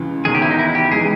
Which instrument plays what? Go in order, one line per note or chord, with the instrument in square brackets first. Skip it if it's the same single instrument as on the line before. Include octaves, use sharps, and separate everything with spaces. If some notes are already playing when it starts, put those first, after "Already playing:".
Already playing: [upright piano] C#2 C#3 E3
[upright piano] E1 E2 D#3 [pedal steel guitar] G#4
[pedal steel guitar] G4
E4
D#4
E4
G4
[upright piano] E3 G#3 D#4 [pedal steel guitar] G#4